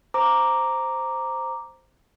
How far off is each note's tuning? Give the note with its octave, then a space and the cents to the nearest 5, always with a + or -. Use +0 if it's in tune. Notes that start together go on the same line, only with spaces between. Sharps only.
C5 +0 A#5 +0 D6 +0